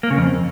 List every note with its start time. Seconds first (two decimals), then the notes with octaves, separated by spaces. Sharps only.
0.03 A#3
0.11 C#3
0.18 F2